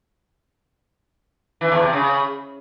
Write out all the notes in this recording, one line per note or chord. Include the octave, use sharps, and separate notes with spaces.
E3
E2
C3
C#3